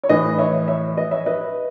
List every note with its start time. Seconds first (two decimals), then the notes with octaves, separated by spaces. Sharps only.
0.04 C#5
0.09 A2 E3 B4 D#5
0.38 C#5 E5
0.68 C#5 E5
0.97 B4 D#5
1.11 C#5 E5
1.26 B4 D#5